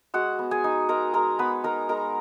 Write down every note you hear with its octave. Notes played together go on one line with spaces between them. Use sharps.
G#3 F#4 F#5
B3
G#4 G#5
D#4
G#3 A#4 A#5
G#3 A#4 A#5
B3 B4 B5
D#4 A#4 A#5
G#3 A#4 A#5